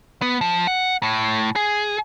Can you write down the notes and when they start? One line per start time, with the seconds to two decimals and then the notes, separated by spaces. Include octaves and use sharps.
0.22 B3
0.41 F3
0.67 F#5
1.03 A2
1.56 G#4